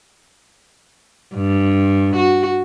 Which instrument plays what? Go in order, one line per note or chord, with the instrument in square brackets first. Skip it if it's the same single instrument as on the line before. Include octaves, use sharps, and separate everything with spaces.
[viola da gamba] G2
F#4